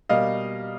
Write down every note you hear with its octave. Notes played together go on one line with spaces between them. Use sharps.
B2 G3 A#3 D#5 F5